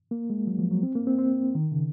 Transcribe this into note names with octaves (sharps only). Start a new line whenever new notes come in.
A#3
G#3
F#3
F3
F#3
C4
A#3
C4
C4
D#3
C#3